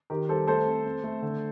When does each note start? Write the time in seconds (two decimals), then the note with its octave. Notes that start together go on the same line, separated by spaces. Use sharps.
0.10 D#3 G4 A#4
0.28 G3 A4 C5
0.47 A3 A4 C5
0.66 C4
0.85 C4
1.04 A3
1.22 D3